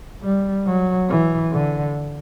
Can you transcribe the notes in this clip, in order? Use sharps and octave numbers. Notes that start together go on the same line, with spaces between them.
G3
F#3
E3
D3